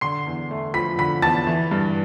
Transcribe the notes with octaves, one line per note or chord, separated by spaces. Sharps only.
D3 C6 C7
E2
A3
F3 B5 B6
D3 B5 B6
E2 A5 A6
E3
G2